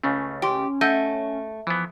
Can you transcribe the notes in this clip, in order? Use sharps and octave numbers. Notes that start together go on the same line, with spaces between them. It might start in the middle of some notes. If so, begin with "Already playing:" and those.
C#2 C#3 A3 C#4
G4 C6 D7
A3 D#5 F#5 E6 G6
E3 F3 B3